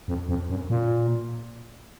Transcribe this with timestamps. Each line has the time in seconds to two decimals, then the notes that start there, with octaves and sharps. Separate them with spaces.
0.08 F2
0.29 F2
0.50 F#2
0.70 A#2